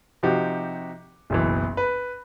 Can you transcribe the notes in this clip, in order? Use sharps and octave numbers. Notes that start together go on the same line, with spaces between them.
C3 F3 D#4 F#4 G4
F#1 B1 E3
B4